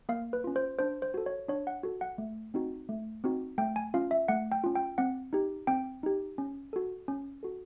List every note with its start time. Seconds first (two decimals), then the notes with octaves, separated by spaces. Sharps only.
0.09 A#3 F5
0.33 B4
0.44 C#4 F4
0.56 C5
0.79 D4 C5
1.02 C5
1.14 F#4 A4
1.26 C#5
1.48 D4 C#5
1.67 F#5
1.83 F#4 A4
2.01 F#5
2.18 A3
2.54 C4 D#4 F#4
2.89 A3
3.24 C4 D#4 F#4
3.58 A3 G5
3.76 G#5
3.94 C#4 F4 F5
4.11 E5
4.28 A3 F#5
4.52 G5
4.64 C#4 F4
4.75 G5
4.98 C4 F#5
5.33 D#4 G4
5.67 C4 G5
6.03 D#4 G4
6.38 C#4
6.73 F#4 A4
7.08 C#4
7.43 F#4 A4